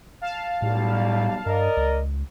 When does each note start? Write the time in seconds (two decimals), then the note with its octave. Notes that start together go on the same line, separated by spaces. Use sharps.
0.21 F5 A5
0.62 B1 A2 G3
1.46 G2 A#4 D5 D#5
1.77 C#2